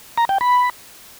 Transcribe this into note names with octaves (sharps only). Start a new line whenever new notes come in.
A#5
G5
B5